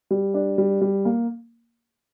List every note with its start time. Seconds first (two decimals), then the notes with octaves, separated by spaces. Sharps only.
0.11 G3
0.34 D4
0.58 G3
0.81 G3
1.05 A#3